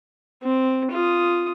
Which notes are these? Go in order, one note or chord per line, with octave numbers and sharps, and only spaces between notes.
C4
F4 D#6